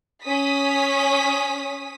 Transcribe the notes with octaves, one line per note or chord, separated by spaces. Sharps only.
C#4 D#6 B6